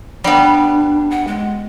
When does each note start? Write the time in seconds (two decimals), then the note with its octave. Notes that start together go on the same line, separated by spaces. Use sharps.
0.24 G3 B3 D4
1.11 F#5
1.28 G#3